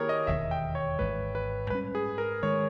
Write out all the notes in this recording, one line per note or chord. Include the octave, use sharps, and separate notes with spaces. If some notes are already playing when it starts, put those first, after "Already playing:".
Already playing: D#3 A#3 E4 G4 G#4 A#4 C#5
D#5
E1 D#2 D#3 E5
G5
C#5
G#1 G#2 E3 G#3 B4
B4
G#2 G3 C#4 B4
G#4
A#4
D#3 G#3 C#5